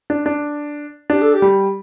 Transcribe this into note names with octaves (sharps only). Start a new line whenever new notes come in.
D4
D4
D4 G4
A4
G4
G3